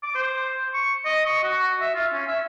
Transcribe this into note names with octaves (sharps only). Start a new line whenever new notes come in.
D6
C5
C#6
D#5
C#6
F#4
E5
F4
C#4
E5